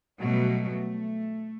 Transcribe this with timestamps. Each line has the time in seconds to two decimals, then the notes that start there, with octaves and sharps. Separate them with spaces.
0.20 B2 F#3 G3 A3
0.71 A3